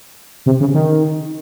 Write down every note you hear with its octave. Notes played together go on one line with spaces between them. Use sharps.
C3
C#3
D#3